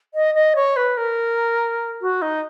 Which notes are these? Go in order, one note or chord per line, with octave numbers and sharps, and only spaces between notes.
D#5
D#5
C#5
B4
A#4
F#4
D#4